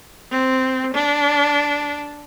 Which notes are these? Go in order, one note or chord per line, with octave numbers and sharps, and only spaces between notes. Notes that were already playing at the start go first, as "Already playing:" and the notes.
C4
D4